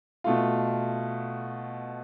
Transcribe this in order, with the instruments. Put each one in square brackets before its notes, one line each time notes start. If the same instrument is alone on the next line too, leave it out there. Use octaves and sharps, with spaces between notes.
[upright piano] B2 A3 F4